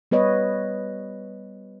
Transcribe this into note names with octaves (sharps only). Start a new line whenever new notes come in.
G3 B3 B4 C#5 D#5